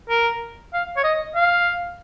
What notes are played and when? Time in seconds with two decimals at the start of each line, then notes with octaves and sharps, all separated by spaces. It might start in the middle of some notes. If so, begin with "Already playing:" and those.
0.09 A#4
0.73 F5
0.97 C#5
1.04 D#5
1.35 F5